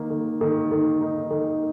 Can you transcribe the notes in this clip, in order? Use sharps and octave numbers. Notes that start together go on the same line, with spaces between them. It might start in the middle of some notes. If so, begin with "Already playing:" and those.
Already playing: D#3 A#3
D#3
D#3
D#3
D#4
D#3